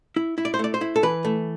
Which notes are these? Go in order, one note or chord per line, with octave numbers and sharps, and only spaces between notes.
E4
E4
D5
C5
A3 D5
C5
E4
A4
E3 B4
A3